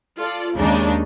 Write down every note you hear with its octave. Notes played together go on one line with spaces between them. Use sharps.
F4 A4 D5
D#2 C#3 G#3 D4 D#4